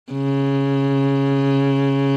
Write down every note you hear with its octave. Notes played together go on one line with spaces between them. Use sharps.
C#3